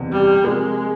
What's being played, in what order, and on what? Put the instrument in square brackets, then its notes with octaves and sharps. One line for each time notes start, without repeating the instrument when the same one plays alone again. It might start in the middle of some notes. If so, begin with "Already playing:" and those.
Already playing: [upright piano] F#1 E2 C3
[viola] G3
[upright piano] C3 F3 A#3 [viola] G#3